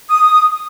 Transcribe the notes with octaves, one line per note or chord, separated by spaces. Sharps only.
D#6